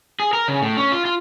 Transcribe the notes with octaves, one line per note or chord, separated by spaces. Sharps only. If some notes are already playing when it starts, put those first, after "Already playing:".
G#4
A#4
C#3
A2
C#4
F4
F4